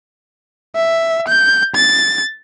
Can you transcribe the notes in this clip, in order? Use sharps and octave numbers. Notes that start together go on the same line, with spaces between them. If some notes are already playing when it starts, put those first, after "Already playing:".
E5
G6
A6